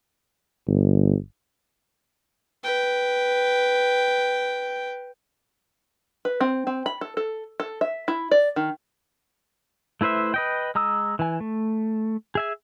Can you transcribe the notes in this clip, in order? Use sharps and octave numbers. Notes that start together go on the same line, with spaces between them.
G1
B4 G5
B4
C4
C4
B5
A4
A4
A4
E5
E4
D5
D#3
A3 E4 B4 C5 E5
B4 D#5 G5
G#3 A#5 D#6 E6
E3 G#5
A3
G#4 E5 G#5